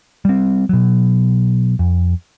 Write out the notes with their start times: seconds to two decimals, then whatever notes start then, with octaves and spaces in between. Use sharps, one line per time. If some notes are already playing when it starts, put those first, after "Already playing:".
0.25 G3 C4
0.69 B2 F#3
1.79 F2